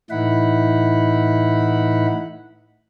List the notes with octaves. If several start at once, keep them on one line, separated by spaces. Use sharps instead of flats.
A2 E3 D#4 E4 F#5 B5